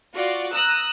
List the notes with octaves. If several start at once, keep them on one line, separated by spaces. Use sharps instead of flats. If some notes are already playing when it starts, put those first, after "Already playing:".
F4 F#4 D5
A#5 D#6 E6 F#6